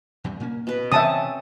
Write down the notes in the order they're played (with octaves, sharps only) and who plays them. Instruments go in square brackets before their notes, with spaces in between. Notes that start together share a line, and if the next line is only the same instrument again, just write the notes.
[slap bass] E2 G2 C3
A#2 A#3 C#4
[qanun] B2 B4
[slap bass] C3 E3 [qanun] C4 C#4 A4 [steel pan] E5 A5 D#6